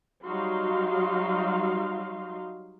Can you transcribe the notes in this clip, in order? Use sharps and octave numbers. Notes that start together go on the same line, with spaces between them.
F#3 G3 D#4 F#4 F5 C6